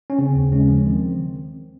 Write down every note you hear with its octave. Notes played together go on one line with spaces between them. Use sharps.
C#4
C#3 C4
D#2
C#3 G#3 C#4
F3
D#3 C4